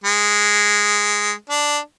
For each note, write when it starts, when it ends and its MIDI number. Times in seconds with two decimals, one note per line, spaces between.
0.04 1.34 56
1.50 1.78 62